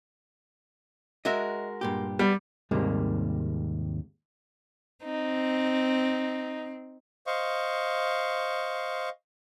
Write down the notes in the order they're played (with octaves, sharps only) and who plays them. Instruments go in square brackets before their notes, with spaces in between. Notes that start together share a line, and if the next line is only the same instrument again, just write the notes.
[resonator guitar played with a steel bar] G#3 F#4 A#4 [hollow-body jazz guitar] D#5 E5
[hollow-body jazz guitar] G2 A#2 G4
[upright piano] G3 [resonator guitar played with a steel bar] B3
[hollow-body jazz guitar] D#2 G#2 C3 G3 G#3 A#3
[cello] C4 [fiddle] D#4
[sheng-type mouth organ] C5 D#5 F5 C#6